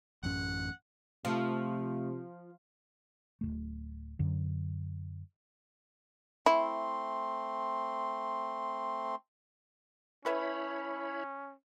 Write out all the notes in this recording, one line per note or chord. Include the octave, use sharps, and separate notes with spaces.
A1 F#2 C#4 F#5
C3 F3 A3
D1 E2 A3
F#2 D3
A3 C4 E4 C6
A3 C#4 E4 B4 C#5 E5 B5